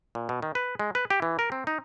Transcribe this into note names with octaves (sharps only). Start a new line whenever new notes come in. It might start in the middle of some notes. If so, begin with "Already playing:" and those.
A#2
B2
D#3
B4
G#3
B4
G4
E3
A#4
C4
D#4